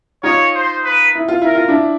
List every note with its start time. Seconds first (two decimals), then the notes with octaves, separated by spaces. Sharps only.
0.23 D#4 F4 C#5
0.55 C5
0.85 B4
1.15 E4
1.28 F4
1.42 E4 A#4
1.55 F4
1.68 D4 E4